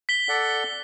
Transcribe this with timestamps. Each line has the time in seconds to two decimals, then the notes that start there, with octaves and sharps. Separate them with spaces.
0.09 B6 G7
0.29 A4 D5 F#5